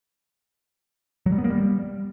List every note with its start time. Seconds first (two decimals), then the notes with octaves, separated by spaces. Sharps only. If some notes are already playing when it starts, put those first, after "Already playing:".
1.26 F#3
1.32 G3
1.38 B3
1.44 A#3
1.50 G3